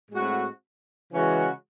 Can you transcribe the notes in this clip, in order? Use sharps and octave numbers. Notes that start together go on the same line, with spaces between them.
A2 G#3 C4 F#4
C#3 E3 G#3 C#4 F#4